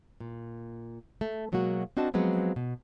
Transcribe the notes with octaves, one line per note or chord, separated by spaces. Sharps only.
A#2
A3
B2 F#3 G#3 A#3 F#4
C4 D4 F#4 D#5 A5
F3 F#3 G#3 B3 C4
B2